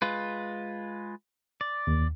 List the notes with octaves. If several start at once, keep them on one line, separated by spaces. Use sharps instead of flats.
G#3 F4 B4
D5
D#2